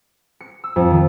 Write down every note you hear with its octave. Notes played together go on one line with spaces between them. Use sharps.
C#7
E6
F2
D#3